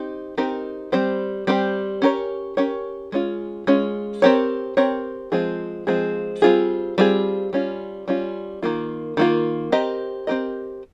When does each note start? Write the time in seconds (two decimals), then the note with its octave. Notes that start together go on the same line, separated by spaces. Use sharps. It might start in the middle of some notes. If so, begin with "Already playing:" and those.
Already playing: C4 D#4 G4
0.38 C4 D#4 G4 A#4
0.92 G3 C4 G4 C5
1.47 G3 C4 G4 C5
2.02 C#4 G4 A#4 C#5
2.57 C#4 G4 A#4 C#5
3.12 G#3 C#4 F4
3.67 G#3 C#4 F4
4.22 C4 G4 A#4 C#5
4.77 C4 G4 A#4 C#5
5.32 F3 G#3 C4 F4 G#4
5.87 F3 G#3 C4 F4 G#4
6.42 G3 C4 F4 G#4
6.98 G3 C4 F4 G#4
7.53 G3 C#4 F4
8.08 G3 C#4 F4
8.63 D#3 A#3 F4
9.17 D#3 A#3 F4
9.72 C4 G4 A#4 D#5
10.27 C4 G4 A#4 D#5